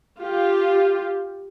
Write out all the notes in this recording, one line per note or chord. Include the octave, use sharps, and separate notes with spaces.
F4 G4